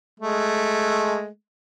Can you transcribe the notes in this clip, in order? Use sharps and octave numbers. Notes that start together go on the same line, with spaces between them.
G#3 A3